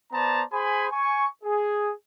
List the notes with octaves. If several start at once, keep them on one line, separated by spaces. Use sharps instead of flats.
B3 C5 D5 A5 A#5
G#4 C5 G#5 B5
G#5 C#6
G#4